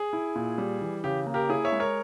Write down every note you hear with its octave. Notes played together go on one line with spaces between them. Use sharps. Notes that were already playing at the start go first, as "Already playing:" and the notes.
Already playing: G#4
E4
A#2
G3
E3
C#3 G4
A#3
G4 A#4
E4 G#4
C#5 E5
G#3
A#4 C#5